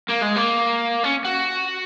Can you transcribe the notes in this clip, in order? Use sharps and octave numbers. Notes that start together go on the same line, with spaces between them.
A#3
G#3
A#3
C#4
F#4